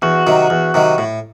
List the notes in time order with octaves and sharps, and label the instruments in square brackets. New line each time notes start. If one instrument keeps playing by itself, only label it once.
[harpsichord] E2 [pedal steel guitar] F#4
[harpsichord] C3 D#3 F#3
E2
C3 D#3 F#3
A2